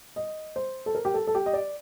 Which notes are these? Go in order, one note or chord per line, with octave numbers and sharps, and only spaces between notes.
D#5
C5
A4
A#4
G4
A4
A4
G4
D#5
D5